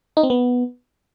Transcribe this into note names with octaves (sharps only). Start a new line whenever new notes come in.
D#4
C4
B3